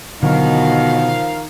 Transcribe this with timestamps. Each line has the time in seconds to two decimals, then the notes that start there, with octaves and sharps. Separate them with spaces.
0.23 B2 D3 D#3 F3 F#3 A#4 F5